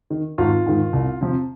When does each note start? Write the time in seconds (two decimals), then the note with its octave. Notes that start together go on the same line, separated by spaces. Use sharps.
0.10 D#3
0.38 G#1 F4
0.66 G#2 D#3
0.93 C2
1.21 C3 F3